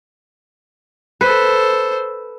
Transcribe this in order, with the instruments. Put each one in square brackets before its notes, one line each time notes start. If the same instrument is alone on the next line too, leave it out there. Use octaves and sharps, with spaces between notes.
[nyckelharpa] A4 C5 [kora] B4